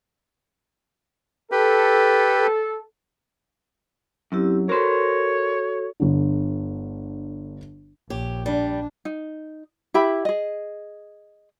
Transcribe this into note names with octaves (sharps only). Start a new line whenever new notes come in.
G4 A4 B4
F#2 C4 E4 G4
F#4 A4 A#4 C5 C#5
G1 D3
A#1 G4 C#5
G3 D4
D#4
E4 G4 E5 B5
G#4 D#5